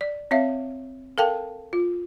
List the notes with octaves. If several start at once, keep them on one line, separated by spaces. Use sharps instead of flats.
D5
C4 C#5 E5 F5
A4 A#4 F5 G5 A5
F4